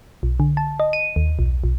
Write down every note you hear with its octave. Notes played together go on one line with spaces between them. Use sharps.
B1
D3
A5
D#5
D#7
D#2
B1
B1